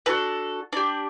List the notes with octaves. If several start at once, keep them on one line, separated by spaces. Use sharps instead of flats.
D4 F#4 A4 B4
D4 G4